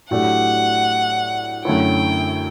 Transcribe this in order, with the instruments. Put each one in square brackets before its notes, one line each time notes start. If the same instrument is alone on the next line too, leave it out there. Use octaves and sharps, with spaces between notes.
[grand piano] A2 F#3 A3 D4 G4 [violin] F#5
[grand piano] F#2 D3 A3 C#4 E4 [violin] G5